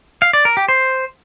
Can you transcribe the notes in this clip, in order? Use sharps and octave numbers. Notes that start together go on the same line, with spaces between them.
F5
D5
A#4
G4
C5